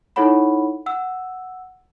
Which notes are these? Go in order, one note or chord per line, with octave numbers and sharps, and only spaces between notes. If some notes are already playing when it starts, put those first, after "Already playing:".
D#4 E4 A4 C#5 F#5 B5
F#5 E6